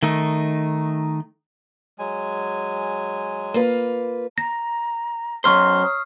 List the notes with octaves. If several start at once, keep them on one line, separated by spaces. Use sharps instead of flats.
D#3 A3 D#4
F#3 G#3 G#5
A#3 F4 B4
A#5 A#6
F#2 C5 C#5 A#5 C#6 F6 C7
D#6